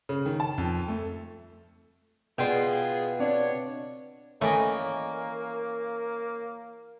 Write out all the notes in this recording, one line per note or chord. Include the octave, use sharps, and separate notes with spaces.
C#3
D#3
A5
F2
A3
B2 F4 G#4 B4 D5 G5 C6
C4 D4 C#5 D5
E3 A3 A#3 C#4 D5 D#5